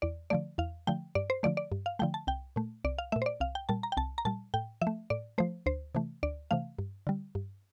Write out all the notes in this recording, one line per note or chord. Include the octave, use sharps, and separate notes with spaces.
E2 D5
D3 F3 A3 D5
E2 F5
D3 F3 A3 G5
G2 D5
C5
D3 F3 A3 D5
D5
G2
F5
D3 F3 A3 G5
A5
C2 G5
A#2 A3
C2 D5
F5
A#2 A3 E5
C5
D5
C2 F5
G5
A#2 G3 A5
A#5
G5
C2 A5
A#5
A#2 G3 A5
A2 G5
F3 E5
A3
A2 D5
F3 A3 C5
D2 C5
C3 E3 A3
D2 D5
C3 E3 A3 F5
G2
D3 G3
G2